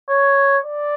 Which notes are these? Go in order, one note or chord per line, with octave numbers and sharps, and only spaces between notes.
C#5
D5